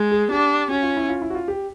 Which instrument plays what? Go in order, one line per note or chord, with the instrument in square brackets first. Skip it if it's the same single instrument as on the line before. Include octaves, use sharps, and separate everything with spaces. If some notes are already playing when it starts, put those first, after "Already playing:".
Already playing: [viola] G#3
[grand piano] G#4
[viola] D4 [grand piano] G4
[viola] C#4 [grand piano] F#4
[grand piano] F4
E4
F4
E4
F#4
F4
G4